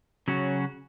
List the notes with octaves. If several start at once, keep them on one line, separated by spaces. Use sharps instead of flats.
C#3 F#3 C#4 F#4